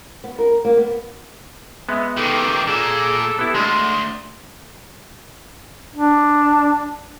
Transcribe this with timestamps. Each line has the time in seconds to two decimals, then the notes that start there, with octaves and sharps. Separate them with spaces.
0.24 B3
0.39 A#4
0.64 A#3
0.77 B3
1.89 G#3 B3 E5
2.17 D#3 E3 G4 A4
2.67 A#2 A#3 G#4 A4 A5
3.39 B3 E4 G4
3.54 D2 G#3 C6
5.95 D4